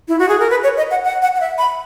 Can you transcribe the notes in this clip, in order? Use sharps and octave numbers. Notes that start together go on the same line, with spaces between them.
E4
F#4
G#4
A#4
B4
C#5
D#5
F#5
F#5
F#5
F#5
E5
B5